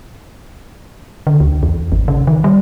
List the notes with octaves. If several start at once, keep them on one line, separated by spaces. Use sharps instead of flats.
D3
D2
E2
G#1
C#3
D#3
G3